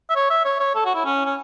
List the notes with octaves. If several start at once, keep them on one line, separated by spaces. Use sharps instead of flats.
E5
C#5
E5
C#5
C#5
A4
F#4
E4
C#4
C#4